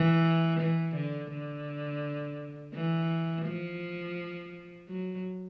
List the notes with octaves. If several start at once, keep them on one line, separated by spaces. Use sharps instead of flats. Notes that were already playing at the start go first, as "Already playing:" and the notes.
Already playing: E3
E3
D3
D3
E3
F3
F#3